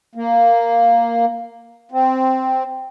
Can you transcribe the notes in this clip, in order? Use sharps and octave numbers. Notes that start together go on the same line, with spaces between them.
A#3
C4